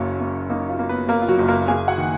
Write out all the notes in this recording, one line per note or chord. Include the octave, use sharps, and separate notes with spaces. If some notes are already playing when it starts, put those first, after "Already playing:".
Already playing: F#1 F#2 A#3 C#4 C#5
A#3
A#3 D#4 D#5
F4 F5
A#3
B3 B4
A#3 A#4
F4
F#3 F#4
F#1
A#3 A#4
A#3 G#4 G#5
F#4 F#5
D#3